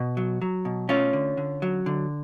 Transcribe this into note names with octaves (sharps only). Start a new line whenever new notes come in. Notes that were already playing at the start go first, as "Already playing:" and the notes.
Already playing: B2
F#3
F#3
B2
A3 C#4 F4
D3
D3
F#3
D3